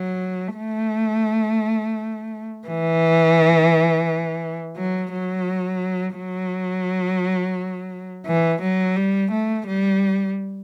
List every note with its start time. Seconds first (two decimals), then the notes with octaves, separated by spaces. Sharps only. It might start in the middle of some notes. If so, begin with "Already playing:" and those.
Already playing: F#3
0.57 A3
2.68 E3
4.78 F#3
5.13 F#3
6.17 F#3
8.27 E3
8.62 F#3
8.96 G3
9.32 A3
9.67 G3